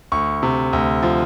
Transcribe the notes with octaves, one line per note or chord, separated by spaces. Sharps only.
D2 C#6
C3
D2
F3